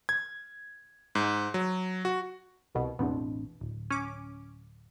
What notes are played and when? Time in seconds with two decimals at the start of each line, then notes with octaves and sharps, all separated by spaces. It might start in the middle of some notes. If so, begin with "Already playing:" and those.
0.09 G#6
1.15 G#2
1.54 F#3
2.05 F#4
2.75 C2 B2
2.99 A1 E2 B2 C4 D4
3.61 D1
3.90 C#4 D6